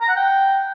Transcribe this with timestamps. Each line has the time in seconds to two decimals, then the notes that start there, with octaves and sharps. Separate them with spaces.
0.01 A#5
0.09 F#5
0.16 G5